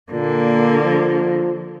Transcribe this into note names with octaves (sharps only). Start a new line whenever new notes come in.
A#2 D3 A#3
F3